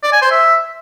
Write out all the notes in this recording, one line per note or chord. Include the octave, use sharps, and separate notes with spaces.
D5
G#5
C5
E5